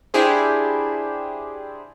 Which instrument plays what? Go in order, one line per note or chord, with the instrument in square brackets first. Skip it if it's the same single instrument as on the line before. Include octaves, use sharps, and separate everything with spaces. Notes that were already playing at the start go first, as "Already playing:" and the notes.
[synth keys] D4 E4 G4 G#4 C5